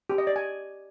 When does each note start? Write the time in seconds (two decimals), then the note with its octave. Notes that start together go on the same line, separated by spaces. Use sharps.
0.10 G4
0.18 D#5
0.27 D5
0.36 G#5